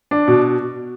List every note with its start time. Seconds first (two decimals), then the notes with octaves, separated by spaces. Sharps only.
0.11 D4
0.28 B2